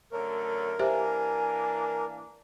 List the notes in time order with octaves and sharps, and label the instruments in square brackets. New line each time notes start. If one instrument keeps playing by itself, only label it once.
[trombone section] F#2 D3 A3 [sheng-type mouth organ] A#4 [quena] C#5
[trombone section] E3 A#3 D4 [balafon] G4 C5 E5 [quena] G#5